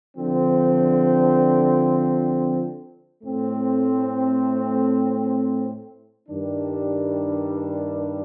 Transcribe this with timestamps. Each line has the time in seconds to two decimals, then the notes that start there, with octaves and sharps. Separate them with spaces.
0.16 D3 F3 C4
3.23 A2 A3 C4
6.28 G2 D#3 G3 D4